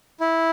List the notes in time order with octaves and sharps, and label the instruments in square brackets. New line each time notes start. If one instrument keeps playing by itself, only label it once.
[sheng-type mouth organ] E4